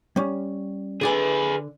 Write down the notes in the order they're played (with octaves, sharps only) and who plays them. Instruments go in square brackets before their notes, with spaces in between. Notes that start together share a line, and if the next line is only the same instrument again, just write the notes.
[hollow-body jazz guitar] G3 C#4
[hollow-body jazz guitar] D3 D5 G#5 [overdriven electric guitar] G#4 B4